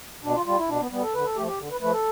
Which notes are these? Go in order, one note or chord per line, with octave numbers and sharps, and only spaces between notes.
B2 D4
F4
G3 F4
E4
B2 D4
B3
G3 B3
A4
D3 B4
A4
F3 A3 G4
G4
D3
B4
F3 A3 B4
A4